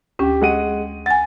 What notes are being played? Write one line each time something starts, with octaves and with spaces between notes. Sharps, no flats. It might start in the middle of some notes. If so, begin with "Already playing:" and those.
D2 C#4 G4
G#3 F#5 D#7
F#5 G#5 A6